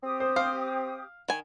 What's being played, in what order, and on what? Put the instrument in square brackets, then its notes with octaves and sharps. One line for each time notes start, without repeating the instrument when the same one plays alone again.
[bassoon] C4 [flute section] G4 D#6
[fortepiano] C5
[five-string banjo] C5 [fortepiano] F5
[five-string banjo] D#3 G#5